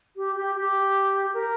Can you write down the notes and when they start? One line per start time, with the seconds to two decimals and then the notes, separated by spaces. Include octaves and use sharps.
0.17 G4
0.36 G4
0.56 G4
1.34 A#4